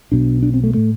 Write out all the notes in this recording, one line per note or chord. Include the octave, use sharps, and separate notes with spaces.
B1 B2 D4
D4
C4
A3
A2 A3